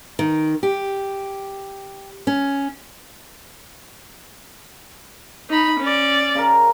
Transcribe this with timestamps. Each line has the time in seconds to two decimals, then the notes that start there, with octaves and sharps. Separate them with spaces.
0.19 D#3
0.63 G4
2.27 C#4
5.50 D#4 B5
5.80 C#4 D5
6.35 C#3 A#4